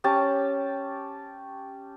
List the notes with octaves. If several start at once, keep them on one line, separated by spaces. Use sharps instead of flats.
C#4 G4 A5